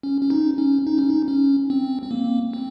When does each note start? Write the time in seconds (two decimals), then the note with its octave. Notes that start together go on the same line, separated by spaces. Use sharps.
0.03 C#4
0.21 C#4
0.30 D#4
0.58 C#4
0.87 D#4
0.98 C#4
1.10 D#4
1.28 C#4
1.70 C4
2.02 C4
2.11 A#3
2.53 C4